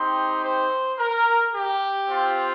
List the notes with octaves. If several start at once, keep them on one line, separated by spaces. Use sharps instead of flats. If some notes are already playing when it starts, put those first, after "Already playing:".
Already playing: C4 D#4 G4 C6
C5
A#4
G4
C4 F4